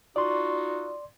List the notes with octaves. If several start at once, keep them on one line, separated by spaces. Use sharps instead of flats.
D#4 F4 F#4 D5 C6